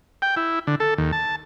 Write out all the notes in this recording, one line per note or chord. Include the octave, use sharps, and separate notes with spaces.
G5
E4
D3
A4
D#2
A5